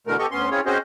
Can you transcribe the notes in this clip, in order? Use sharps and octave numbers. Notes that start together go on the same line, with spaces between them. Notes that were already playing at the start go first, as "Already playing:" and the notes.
B2 D3 E3 A3 A#4
B3 G4 A4 D#5 C#6
D2 B3 C#4 C6
C4 C#4 E4 F4 G#4 C#5
C4 C#4 F#4 G#4 C5 D#5